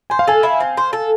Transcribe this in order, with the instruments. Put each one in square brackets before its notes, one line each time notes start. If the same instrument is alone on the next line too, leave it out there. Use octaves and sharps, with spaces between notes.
[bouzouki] C5 [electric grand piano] G#5
[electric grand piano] F5
[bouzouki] A4 [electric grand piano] G#5
[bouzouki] E4
C4
C5
A4